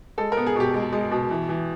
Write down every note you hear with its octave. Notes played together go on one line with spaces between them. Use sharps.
G#3 A4
A#4
B3
G#4
B2 G4
G#3
G#3
B2
E3
E3